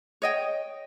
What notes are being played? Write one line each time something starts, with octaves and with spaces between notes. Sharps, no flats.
C#5 D#5 G5